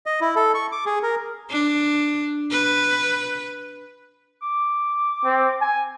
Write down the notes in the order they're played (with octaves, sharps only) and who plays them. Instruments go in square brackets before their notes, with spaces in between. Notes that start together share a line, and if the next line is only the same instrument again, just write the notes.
[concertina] D#5
E4
A4
C#6
D6
G#4
A#4
[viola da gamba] D4
B4
[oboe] D6
[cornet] C4
G#5